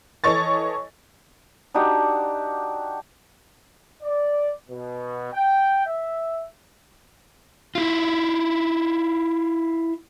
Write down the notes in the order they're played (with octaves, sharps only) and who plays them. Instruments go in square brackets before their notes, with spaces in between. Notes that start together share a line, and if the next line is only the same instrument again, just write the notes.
[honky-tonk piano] E3 A4 C#5 D#5 C#6 A6
[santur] D4 D#4 F#4 G4
[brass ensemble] D5
B2
G5
E5
[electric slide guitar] E4 F4